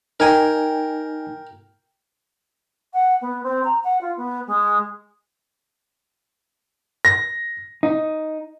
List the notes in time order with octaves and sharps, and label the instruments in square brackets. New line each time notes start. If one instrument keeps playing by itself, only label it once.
[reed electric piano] D#4 G#5 [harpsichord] A#4 G5
[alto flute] F#5
B3
C4
A#5
F#5
F4
B3
G#3
[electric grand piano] A#6
[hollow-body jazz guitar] D#4